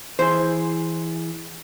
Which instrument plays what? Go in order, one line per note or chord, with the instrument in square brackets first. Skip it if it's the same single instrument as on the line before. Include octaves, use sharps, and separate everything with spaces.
[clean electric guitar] E3 E4 G#4 [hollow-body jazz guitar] C5